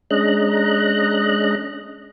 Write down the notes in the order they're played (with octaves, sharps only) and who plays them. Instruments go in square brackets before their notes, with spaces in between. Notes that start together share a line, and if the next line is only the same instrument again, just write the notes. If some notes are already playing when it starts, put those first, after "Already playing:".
[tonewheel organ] G#3 C#4 D4 D#5 A#5 F#6